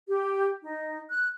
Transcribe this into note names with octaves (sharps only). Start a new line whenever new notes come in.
G4
D#4
F#6